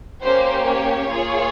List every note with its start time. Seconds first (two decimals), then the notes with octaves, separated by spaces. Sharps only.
0.22 A#3 C#4 G4 C5
0.65 C#5
1.09 A#3 F4 G#4